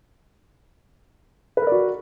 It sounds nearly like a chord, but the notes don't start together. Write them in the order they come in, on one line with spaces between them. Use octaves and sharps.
B4 A#4 D5 F#4